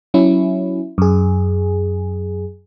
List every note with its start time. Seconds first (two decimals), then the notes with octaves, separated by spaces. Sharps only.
0.14 F#3 C#4 E4
0.98 F#2 G#4